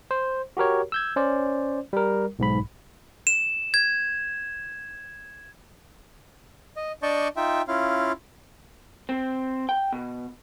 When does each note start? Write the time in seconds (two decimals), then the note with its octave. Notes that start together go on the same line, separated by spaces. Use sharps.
0.11 C5
0.57 F#4 G4 A#4 C#5
0.92 E6 G6 G#6
1.16 C#4 C5 D5
1.93 G3 A#4
2.39 B1 G#2 B5
3.27 E7
3.74 G#6
6.76 D#5
7.03 D4 D5 D#5 A5 C#6 G6
7.36 D#4 F4 E5 G5
7.68 C#4 E4 F4 F5
9.09 C4
9.69 G5
9.92 B2